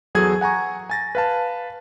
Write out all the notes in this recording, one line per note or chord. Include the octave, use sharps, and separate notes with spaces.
E2 F#3 G#4 A4 G#6
F#5 G#5 A#5 C#6
G#5 A6 A#6
B4 F5 A5